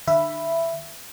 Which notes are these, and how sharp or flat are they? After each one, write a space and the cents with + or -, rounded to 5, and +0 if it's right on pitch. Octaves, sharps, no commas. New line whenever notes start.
D3 +45 E5 +15 B5 +0